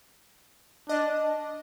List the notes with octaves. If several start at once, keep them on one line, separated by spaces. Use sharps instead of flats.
D4 D#5